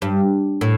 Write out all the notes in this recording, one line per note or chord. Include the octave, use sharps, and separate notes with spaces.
G2
A2